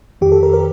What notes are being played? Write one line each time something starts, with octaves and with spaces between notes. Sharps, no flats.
F2 D#3 G4
A4
A#4
A#4